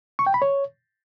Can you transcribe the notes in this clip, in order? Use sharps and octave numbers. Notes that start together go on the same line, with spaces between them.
C#6
G5
B5
C#5